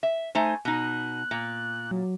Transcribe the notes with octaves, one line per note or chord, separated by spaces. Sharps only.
E5
A3 D#4 C5 G#5
B2 D#4 F#6
A#2
F#3